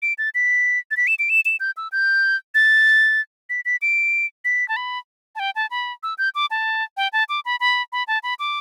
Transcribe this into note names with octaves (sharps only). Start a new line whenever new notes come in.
D7
A6
B6
A6
B6
E7
D7
E7
E7
G6
E6
G6
A6
B6
B6
D7
B6
A5
B5
A5
G5
A5
B5
E6
G6
D6
A5
G5
A5
D6
B5
B5
B5
A5
B5
D6